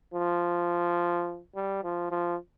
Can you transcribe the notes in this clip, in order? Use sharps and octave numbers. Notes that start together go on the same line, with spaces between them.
F3
G3
F3
F3